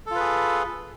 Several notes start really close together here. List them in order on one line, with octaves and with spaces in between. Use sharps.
A4 F4 B4 G#4